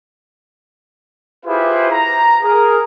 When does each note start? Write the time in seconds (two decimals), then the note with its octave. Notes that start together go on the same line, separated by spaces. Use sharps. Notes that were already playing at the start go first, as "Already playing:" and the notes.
1.45 E4 F4 G4 G#4 B4 C5
1.91 A#5
2.42 G#4 A#4 A#5